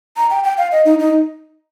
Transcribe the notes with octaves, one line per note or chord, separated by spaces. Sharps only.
A#5
G5
G5
F5
D#5
D#4
D#4